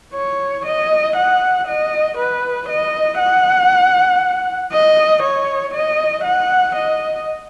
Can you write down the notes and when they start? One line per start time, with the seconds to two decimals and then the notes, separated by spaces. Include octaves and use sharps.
0.14 C#5
0.65 D#5
1.16 F#5
1.67 D#5
2.17 B4
2.69 D#5
3.19 F#5
4.73 D#5
5.23 C#5
5.74 D#5
6.24 F#5
6.75 D#5